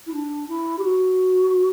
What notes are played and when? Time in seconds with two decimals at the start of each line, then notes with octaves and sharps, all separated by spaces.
0.06 E4
0.13 D4
0.48 E4
0.78 G4
0.83 F#4